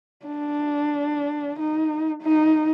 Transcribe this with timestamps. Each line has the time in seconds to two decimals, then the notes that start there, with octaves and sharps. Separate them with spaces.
0.25 D4
1.59 D#4
2.22 D#4